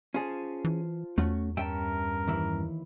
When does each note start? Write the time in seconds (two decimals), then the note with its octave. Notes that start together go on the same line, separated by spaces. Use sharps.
0.14 C#4 F4 G#4 C5 A5
0.65 E3
1.18 E2 A3 C#4 F#4
1.57 G2 C#4 A#4 E5 G5 A5
2.28 D#2 E3 E4